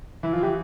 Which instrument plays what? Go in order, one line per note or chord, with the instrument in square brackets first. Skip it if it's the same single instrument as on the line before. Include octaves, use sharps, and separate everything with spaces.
[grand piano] E3 [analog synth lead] E4
[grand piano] F3 [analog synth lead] F4
[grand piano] E3 [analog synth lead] G4